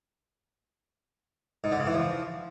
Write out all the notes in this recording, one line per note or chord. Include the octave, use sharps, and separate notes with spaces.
G#2
D3
C#3
E3
F3